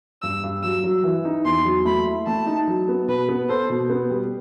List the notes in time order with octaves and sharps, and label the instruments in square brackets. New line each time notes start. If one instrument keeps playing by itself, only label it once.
[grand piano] G2 [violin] E6
[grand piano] G2
[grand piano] F#3 [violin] E6
[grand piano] F#3
E3
D#4
[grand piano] E2 [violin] C6
[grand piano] F#3
[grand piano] A3 [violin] B5
[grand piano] E4
[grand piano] A3 [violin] A5
[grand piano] D#4
F#3
B3
[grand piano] B2 [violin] B4
[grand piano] B3
[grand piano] A4 [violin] C5
[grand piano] B2
B3
G3